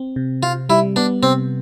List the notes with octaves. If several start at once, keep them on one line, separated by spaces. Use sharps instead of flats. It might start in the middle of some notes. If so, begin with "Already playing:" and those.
Already playing: C4
C3
C3 F4
G3 E4
B3 D4
C3 C4